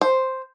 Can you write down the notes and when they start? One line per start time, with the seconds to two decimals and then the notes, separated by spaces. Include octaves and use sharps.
0.01 C5